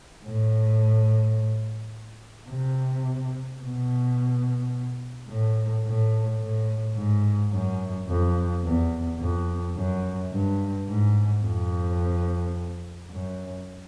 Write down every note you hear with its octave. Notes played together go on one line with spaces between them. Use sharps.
A2
C3
B2
A2
A2
A2
G#2
F#2
F2
E2
F2
F#2
G2
G#2
F2
F#2